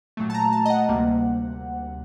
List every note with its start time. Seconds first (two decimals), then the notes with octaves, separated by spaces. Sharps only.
0.17 A#2 F#3 A3
0.30 A5
0.34 A#5
0.53 A5
0.66 D#5
0.70 F#5
0.89 D2 C3 G3 A#3